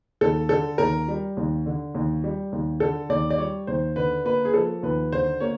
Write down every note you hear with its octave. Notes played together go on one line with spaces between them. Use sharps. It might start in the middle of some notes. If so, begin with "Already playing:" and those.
D#2 A4
D3 A4
D#2 A#4
G3
D#2
D3
D#2
G3
D#2
D3 A4
D#2 D5
D5
G3 C#5
D#2 C5
D3 B4
A#3 B4
G#4
F3 A4
D#2 B4
D3 C5
A#3 C#5